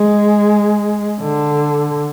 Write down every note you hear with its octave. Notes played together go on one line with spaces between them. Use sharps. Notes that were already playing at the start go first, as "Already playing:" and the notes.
Already playing: G#3
D3